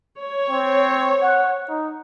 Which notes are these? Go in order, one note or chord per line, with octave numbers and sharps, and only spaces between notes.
C#5
C4
F#5
D#4